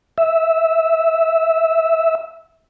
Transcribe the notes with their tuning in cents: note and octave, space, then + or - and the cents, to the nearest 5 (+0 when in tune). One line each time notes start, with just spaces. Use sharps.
E5 -10